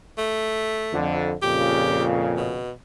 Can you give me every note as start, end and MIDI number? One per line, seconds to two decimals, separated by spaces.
0.18 0.99 57
0.93 1.33 41
0.93 1.33 50
1.42 2.65 41
1.42 2.65 46
1.42 2.65 49
1.42 2.04 67
2.37 2.71 47